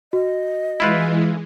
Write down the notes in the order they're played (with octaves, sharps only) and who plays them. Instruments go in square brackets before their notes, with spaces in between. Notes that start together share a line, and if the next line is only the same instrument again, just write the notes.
[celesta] F#4 [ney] D#5
[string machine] E3 G#3 [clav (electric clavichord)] E4 F4 B4